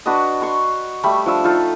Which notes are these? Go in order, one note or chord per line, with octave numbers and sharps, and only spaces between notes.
D4 F#4 B4 D#5
C6 C#6
G3 A3 B5
F3 D4 E6
D#4 F4 A4